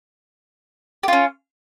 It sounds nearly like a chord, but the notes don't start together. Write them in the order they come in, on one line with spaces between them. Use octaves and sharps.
G4 F4 C#4